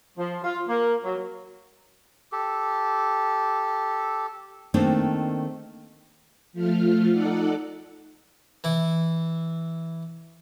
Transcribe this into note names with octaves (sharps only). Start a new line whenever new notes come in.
F3
F4
A#3
F#3
G4 A4
D#3 A3 A#3 C4 D4 D#4
F3 A3 F4 F6
D#4 A4 D5 F#5
E3 E4